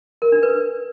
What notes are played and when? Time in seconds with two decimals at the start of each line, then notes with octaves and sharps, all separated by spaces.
0.22 A#4
0.32 D4
0.43 B4